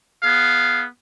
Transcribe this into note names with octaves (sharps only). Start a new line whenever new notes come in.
B3 G#4 F5